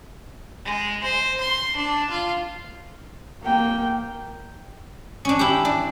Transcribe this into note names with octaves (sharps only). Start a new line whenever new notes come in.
G#3
C5
C6
D4
F4
A#3 G5
C#4 D4
E4 G4
D4